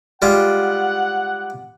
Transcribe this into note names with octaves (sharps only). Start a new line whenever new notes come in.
G3 G#3 F4 F#5